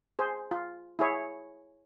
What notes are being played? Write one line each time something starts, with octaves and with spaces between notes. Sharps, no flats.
G#4 C5
F4
E4 G#4 C#5